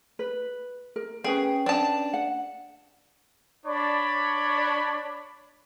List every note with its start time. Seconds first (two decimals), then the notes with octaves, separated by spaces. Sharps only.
0.19 B4
0.96 A#4
1.24 C#4 G#4 B4 G5
1.66 D4 A5
2.13 F#5
3.66 D4 C#5 D5 B5